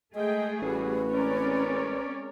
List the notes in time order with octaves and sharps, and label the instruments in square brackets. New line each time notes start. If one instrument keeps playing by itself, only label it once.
[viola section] G#3 G5 [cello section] A3 G#4 [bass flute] D#5
[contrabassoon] A1 [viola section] G3 F#4 [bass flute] B4
[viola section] G#3 A#4 C#5 [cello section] C4 C#4 D5